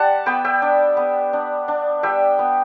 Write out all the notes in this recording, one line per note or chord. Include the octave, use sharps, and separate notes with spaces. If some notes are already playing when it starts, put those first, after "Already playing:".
Already playing: G3 F#5 A5
B3 G5 B5
E5 G5
D4
B3
D4
D4
G3 E5 G5
B3